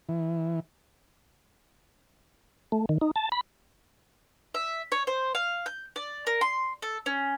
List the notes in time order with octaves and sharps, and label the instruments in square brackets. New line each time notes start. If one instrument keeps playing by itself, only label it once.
[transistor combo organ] E3
[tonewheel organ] A3
D#3
D#4
A5
B5
[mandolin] E5
C#5
C5
F5
G6
D5
A#4
C6
A4
C#4